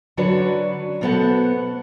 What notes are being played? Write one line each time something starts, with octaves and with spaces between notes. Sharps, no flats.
D3 F#3 D4 F#4 B4 C#5
B2 F#3 B3 A4 C5 F#5